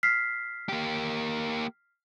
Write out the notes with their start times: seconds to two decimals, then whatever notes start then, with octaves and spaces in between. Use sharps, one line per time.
0.03 F6 B6 C7
0.69 A#3 G4